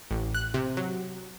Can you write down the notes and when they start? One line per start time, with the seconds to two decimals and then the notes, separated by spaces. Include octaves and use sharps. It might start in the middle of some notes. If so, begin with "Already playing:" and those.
0.11 A1
0.35 F#6
0.54 C3
0.77 F#3